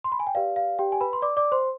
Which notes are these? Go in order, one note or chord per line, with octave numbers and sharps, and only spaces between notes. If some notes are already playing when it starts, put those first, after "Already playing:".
C6
B5
G#5
G5
G4 B4 D5 F5
F5
G4 G5
G#5
B4 B5
C6
D5 D6
D5 D6
C5 C6